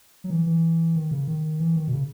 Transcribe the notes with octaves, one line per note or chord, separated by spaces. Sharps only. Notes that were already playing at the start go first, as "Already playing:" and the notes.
F#3
E3
E3
D#3
C#3
D#3
E3
D#3
B2
C#3